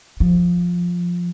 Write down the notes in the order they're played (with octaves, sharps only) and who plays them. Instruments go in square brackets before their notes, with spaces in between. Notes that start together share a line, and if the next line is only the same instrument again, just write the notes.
[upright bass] F3